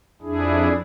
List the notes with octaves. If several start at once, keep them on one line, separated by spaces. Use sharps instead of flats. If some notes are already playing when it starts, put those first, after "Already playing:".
F2 D4 E4 G#4